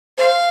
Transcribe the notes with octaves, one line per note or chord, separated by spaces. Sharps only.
C5 F5